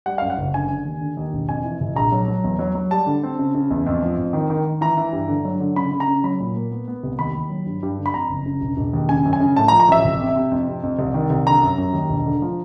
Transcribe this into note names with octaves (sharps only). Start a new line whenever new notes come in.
G3 F#5
F5
F#2
F#5
F#1
D3 G#5
D3
D#2
D3
D#2
E1
F2 G#5
E3
F1
A#1 A#5
F#3
F#3
E2
F#3
F#3
G3 A5
D3
C4
C#3
C#3
E2
F2
F3
F2
D#3
D#3
D#3
E3 A#5
E3
G2
D3
F#3
D3
C#3 B5
C#3
A#5
C#3
F#3 B5
A#2
A#3
B3
B3
C2
D#2 B5
D#2
F#3
G2
G2
D3
B5
F2 A#5
F#1
C#3
E1
E1
D#2
C#3 G#5
F#2
G#5
C#3
A2 A5
A#5
F3
A#5
A1 E5
F1
C3
C3
F2
C3
F2
C2
D#3
C2
D3 A#5
F#2
F#2
D#2
E1
D3
F3